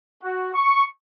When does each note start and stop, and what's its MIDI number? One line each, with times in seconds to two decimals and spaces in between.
0.23 0.52 66
0.55 0.85 85